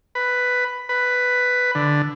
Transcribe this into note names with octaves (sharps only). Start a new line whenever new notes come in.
B4
B4
D3